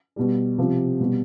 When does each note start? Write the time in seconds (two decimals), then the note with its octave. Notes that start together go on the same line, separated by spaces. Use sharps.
0.16 B2 G3
0.58 C3 F3
1.01 B2 G3